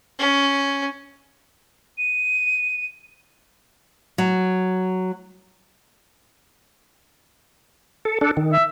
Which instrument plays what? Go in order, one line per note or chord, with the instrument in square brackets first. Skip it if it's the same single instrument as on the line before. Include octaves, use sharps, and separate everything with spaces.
[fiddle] C#4
[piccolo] D#7
[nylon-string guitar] F#3
[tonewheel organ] A4
D4 A4
D#3
[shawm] E5